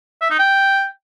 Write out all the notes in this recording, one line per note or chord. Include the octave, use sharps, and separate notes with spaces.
E5
D#4
G5